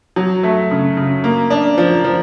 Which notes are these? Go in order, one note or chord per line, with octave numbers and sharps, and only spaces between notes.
F#3
A3
C#3
C#3
A#3
D4
F3
F3